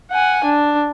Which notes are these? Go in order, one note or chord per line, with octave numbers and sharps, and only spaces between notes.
F#5 G#5
D4